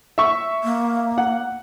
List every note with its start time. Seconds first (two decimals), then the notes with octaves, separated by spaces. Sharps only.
0.18 E5 C#6
0.64 A#3
1.18 F#5